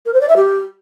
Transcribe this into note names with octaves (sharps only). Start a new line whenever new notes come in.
A#4
C5
D5
E5
G4